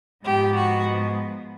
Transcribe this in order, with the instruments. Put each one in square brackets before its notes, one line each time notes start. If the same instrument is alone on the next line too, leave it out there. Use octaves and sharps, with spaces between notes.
[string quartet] G#2 F3 G#3 B3 G4
F#4